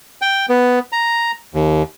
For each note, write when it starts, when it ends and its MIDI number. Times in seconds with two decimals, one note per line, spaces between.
0.22 0.46 79
0.49 0.79 59
0.92 1.32 82
1.54 1.83 39